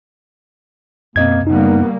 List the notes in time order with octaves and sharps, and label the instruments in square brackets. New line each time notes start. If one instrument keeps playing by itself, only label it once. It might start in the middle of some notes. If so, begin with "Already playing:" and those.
[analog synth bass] F#2 [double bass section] B2 [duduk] A#3 [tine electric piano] C4 D#5 G#6
[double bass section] C#3 G3 A#3 [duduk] B3 [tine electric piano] D#4